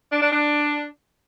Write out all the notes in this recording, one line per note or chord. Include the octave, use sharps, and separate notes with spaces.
D4
D4
D4